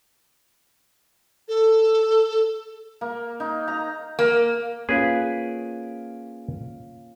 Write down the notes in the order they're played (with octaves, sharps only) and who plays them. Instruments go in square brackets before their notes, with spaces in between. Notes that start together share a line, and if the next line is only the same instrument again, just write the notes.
[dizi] A4
[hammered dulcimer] A#3
D#4
A#5
[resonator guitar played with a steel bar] A#3
[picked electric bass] A#3 [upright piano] C#4 F4 [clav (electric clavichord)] G#4 B4